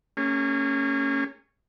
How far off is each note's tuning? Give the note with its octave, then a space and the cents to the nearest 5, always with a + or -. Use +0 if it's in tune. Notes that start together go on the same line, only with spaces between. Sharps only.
A#3 -35 C#4 +0 G#4 -35